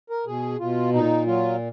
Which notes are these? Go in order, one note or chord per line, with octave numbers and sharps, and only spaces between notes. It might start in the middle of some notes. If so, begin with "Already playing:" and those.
A#4
B2 G#4
B2 F4
A#2 D#4
F#3 F4